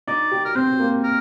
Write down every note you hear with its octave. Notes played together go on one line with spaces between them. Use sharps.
D#4 D5
G4
A#4
C4 C5
A#3
A#4